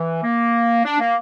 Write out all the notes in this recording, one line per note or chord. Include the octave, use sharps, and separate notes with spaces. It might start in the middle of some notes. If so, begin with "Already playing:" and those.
Already playing: E3
A#3
D4
A#3